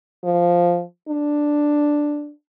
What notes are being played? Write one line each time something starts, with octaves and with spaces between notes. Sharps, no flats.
F3
D4